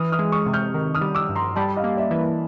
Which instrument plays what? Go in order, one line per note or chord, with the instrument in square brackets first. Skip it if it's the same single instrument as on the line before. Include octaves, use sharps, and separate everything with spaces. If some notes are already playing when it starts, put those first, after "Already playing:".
Already playing: [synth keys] E3 [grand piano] D#6 F6
[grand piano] D#6 F6
[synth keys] G#3
[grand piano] C#6 D#6
[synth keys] C3
[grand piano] F6 G6
[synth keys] D#3
[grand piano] D#6 F6
[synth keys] G3
[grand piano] D6 E6
[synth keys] G2
[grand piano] A#5 C6
[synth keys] G3 [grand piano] A5 B5
[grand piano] D#5 F5
[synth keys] A#3
[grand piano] D5 E5
[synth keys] E3